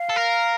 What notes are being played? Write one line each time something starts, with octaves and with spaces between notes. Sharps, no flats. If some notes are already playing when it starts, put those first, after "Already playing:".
Already playing: F5
A4
A#4